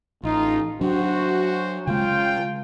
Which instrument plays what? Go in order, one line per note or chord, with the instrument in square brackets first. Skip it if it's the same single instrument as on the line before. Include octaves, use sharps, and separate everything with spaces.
[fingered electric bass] A1 [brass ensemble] D#4 F4
[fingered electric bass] F#3 D4 [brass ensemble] F#4 C5
[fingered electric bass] C#3 G#3 [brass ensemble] F4 G5